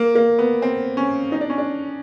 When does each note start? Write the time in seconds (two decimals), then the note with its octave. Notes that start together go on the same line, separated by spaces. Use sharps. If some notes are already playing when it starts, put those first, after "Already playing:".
Already playing: A#3
0.15 A#3
0.39 B3
0.62 C4
0.97 C#4
1.32 D#4
1.41 D4
1.50 C#4
1.58 D4